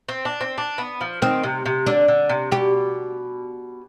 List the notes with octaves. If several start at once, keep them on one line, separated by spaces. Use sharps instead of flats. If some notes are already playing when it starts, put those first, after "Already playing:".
C4
D4
C4
D4
B3
F3
D#3 C4
C3
C3
D3 D4
D3
C3
B2 G4